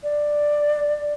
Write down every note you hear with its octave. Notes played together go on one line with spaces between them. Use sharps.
D5